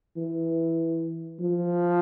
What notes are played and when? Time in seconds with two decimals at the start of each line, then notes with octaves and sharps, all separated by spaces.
0.17 E3
1.40 F3